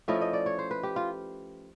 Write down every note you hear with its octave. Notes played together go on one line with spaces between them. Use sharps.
F3 A3 C#4 E4 D#5
D#5
D5
C#5
C5
B4
G4
F4